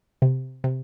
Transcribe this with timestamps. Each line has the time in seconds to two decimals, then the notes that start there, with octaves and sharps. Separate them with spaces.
0.22 C3
0.64 C3